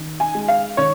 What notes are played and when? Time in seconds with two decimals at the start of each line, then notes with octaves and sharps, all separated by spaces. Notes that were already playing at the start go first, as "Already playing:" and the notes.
Already playing: D#3
0.20 G#5
0.35 G#3
0.48 F5
0.77 D#3 C#5